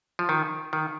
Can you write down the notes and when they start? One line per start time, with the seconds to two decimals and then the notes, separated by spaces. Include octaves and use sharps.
0.19 F3
0.29 D#3
0.73 D#3